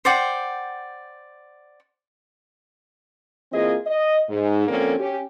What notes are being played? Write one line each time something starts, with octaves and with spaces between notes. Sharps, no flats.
C5 D5 F#5 G5
E3 A#3 C4 F4 G#4 D#5
D#5
G#2
D3 F3 A#3 C4 C#4 A4
C#4 G4